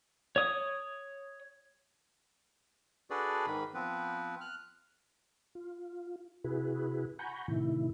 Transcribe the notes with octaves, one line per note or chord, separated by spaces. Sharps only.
C#5 D#6
D4 F#4 G#4 A4 B4 D5
G#2 D#3 B5
F3 B3 C4 B4
F6 F#6
F4
C3 E4 F#4 G#4 B4
F#5 G#5 A#5 B5 C#6 G6
A2 C3 D#3 E4